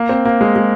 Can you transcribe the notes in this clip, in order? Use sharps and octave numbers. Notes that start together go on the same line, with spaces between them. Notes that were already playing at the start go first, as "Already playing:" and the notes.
Already playing: A#3
C4
A#3
G#3
G#3